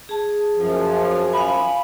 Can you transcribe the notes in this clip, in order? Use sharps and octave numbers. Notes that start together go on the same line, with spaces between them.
G#4 A5
F#2 F3
F5 G#5 B5